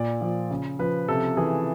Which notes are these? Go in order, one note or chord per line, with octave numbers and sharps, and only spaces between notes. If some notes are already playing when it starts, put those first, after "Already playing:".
Already playing: A#2 D5
F3
C#3
F3 B4
C3 A4
E3 G#4